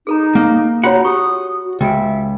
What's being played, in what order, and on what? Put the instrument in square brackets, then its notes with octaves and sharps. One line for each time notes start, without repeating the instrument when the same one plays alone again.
[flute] D#4 [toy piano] G#4 A4 A#5
[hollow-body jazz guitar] A#3
[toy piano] F4 F#4 C#5 [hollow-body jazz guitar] F#5 [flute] A#5
[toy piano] G4 C#6 [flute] D#6
[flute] F#4
[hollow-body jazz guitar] C#2 [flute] E5 [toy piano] G5 G#5